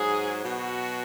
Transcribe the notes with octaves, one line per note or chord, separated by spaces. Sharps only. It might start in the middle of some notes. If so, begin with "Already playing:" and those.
Already playing: G#2 F#3 G#4
B2 F#3 F#4